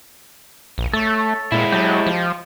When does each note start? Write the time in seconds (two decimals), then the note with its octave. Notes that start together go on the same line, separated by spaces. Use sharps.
0.78 A#1
0.93 A3 A4 C#5
1.52 A#2 G#3 E4
1.72 F#3 G4 D#5 A5
2.07 F3